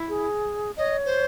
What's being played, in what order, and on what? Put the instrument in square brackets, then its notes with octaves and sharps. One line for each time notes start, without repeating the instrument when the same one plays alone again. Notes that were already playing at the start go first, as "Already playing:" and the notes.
Already playing: [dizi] E4
[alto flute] G#4
[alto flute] C#5 [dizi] D#5
[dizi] C5